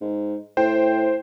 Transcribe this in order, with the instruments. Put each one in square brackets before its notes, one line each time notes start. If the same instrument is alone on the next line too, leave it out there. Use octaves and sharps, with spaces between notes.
[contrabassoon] G#2
[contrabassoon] A2 [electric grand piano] C5 G5